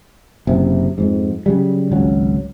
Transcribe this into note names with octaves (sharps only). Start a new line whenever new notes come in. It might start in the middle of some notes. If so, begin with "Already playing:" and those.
F#1 C3
F2 G#2
C#3 F#3 G3
G#1 C#2 F#3